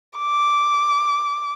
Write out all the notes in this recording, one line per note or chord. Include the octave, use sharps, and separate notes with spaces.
D6